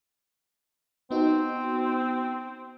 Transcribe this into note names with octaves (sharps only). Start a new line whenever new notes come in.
B3 C4 D#4 F#4